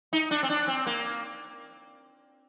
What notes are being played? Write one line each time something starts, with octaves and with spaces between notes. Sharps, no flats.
D#4
D4
C4
D4
C4
A#3